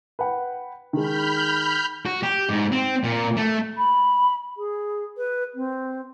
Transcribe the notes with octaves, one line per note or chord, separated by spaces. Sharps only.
B4 F#5 G5
D#3 G#3 B5 F6 G6
F#4
G4
G#2
C4
A#2
A3
B5
G#4
B4
C4